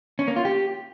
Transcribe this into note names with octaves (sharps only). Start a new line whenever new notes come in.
C#4
A#3
F4
G4